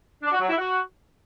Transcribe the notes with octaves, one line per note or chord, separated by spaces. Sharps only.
D4
F#4
F#3
E4
F#4